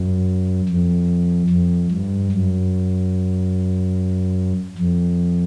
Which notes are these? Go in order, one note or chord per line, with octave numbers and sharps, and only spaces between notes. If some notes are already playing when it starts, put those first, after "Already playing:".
Already playing: F#2
F2
F2
G2
F#2
F2